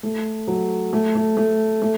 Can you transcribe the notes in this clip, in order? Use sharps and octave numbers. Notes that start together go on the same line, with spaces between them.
A3
F#3
A3
A3
A3
A3